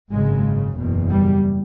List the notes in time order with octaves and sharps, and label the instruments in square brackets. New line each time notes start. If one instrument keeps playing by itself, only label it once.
[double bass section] G#1 F#2 C#3 G#3
F#1 E2 B2
G3